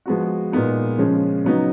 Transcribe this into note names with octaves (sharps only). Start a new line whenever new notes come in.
F3 G#3 B3 F#4
A#2 G#3 B3 D#4
C#3 F3 G#3 C#4
C#3 F#3 B3 D#4